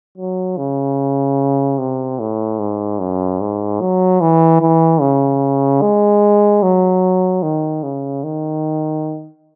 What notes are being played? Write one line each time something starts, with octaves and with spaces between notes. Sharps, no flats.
F#3
C#3
C3
A2
G#2
F#2
G#2
F#3
E3
E3
C#3
G#3
F#3
D#3
C#3
D#3